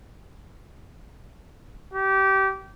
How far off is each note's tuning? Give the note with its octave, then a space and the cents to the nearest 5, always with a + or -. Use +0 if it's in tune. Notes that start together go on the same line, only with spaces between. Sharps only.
G4 -25